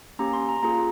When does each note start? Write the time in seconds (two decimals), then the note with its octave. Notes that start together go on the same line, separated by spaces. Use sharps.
0.19 A#3 C#4 G4 A#5
0.33 C6
0.49 A#5
0.63 A#3 F4 G#4 A#5